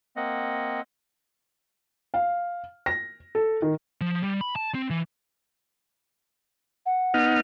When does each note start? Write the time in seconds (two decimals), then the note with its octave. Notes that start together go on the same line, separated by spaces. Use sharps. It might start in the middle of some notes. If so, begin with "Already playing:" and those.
0.16 A#3 C4 D#5 F#5
2.14 F5
2.86 A#6
3.35 A4
3.62 D#3
4.01 F3
4.23 G3
4.41 B5
4.56 A5
4.75 C4
4.90 E3
6.86 F#5
7.14 B3 D#4 F6